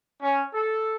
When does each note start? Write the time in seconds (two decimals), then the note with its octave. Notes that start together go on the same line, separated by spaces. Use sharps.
0.22 C#4
0.53 A4